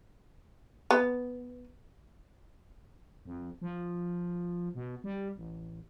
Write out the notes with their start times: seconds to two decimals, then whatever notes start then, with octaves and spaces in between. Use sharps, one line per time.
0.91 B3
3.25 F2
3.61 F3
4.75 B2
5.04 G3
5.36 A1